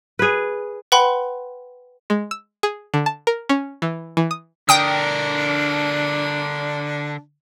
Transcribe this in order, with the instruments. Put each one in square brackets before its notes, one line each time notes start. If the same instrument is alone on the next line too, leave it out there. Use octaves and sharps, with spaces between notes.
[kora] G#4 B4
[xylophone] B4 F#5 G5 B5 C6
[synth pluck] G#3
E6
G#4
D3
A5
A#4
C#4
E3
E3
D#6
[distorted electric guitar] D3 A#4 [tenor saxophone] D4 [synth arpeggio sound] G5 D#6